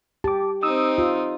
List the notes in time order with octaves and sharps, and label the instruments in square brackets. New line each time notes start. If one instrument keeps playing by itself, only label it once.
[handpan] G4 [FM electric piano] A5 D6
[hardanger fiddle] C4 D#4 [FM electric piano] D#6 E6
[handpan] F4